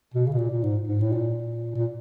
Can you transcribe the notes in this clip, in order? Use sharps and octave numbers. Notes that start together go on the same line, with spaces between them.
B2
C#3
B2
A#2
A#2
G#2
G#2
A2
A#2
A#2